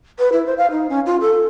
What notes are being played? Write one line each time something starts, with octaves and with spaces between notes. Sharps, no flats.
B4
E4
C5
F5
D#4
C#4
F4
A4